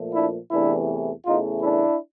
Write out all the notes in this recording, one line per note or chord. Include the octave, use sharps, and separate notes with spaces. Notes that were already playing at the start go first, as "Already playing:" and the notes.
Already playing: A#2 F3 A3
D4 E4
E2 C3 E3 A3 D4 E4
E2 C#3 E3 A3 D#4 F4
D4 E4